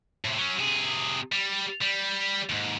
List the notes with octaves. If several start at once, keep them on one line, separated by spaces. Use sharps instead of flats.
A2 C3
F#3 C#4
C3 G#4
G3
G3
D#2 G#2